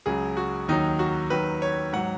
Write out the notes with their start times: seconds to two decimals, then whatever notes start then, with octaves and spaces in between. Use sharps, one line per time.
0.06 C#2 C#3 F#3 G#4
0.37 F#4
0.68 D#2 D#3 F#3 D#4
0.99 F#4
1.30 D#2 D#3 F#3 B4
1.62 C#5
1.93 G#2 F#3 F#5